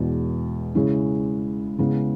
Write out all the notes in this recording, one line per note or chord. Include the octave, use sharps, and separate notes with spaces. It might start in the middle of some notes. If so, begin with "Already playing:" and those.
Already playing: E2 B2 G#3
C#3 G#3 C#4 E4
C#3 G#3 B3 E4